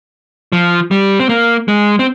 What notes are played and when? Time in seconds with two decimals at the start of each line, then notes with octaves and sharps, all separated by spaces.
0.52 F3
0.91 G3
1.19 C4
1.29 A#3
1.68 G#3
1.99 C4